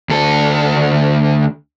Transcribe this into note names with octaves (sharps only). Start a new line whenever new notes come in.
D2 A4